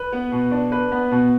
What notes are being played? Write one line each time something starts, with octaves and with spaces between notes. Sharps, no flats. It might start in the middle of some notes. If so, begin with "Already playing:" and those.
Already playing: B4
B3
B2
D4
B4
B3
B2